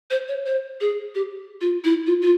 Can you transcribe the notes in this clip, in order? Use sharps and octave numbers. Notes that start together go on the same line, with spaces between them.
C5
C#5
C5
G#4
G4
F4
E4
F4
F4